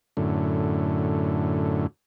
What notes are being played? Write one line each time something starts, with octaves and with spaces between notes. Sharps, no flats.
F#2 A2 D3